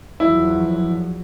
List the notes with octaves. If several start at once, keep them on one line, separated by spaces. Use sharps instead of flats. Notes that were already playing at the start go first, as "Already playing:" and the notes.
E2 F3 F#3 E4